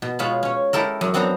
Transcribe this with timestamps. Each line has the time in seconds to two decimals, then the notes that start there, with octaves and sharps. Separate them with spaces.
0.02 B2
0.19 B2 G#3 F4 C#5 F5 B5
0.43 C#4 C#5
0.73 G#3 E4 G4 A4 A#4
1.01 F#2
1.14 B3 C4 D4 C5 F#5 A#5